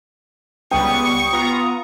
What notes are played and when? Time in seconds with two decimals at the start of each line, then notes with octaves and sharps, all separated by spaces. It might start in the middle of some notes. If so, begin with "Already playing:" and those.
0.71 C#2 G3 B3 G5 C#6 D#6
1.33 B3 F4 A#5